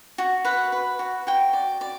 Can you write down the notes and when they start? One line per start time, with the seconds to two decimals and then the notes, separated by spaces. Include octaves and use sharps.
0.18 F#4
0.45 B4 F#5
0.72 B4
0.99 F#4
1.27 F#4 G5
1.53 D5
1.81 D5